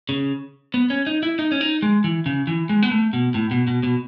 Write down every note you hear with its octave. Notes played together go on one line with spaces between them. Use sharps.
C#3
B3
C#4
D#4
E4
D#4
C#4
D#4
G#3
E3
C#3
E3
G#3
B3
A3
B2
A2
B2
B2
B2